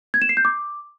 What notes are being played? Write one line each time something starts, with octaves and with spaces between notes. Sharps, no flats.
G#6
E7
C7
G6
D6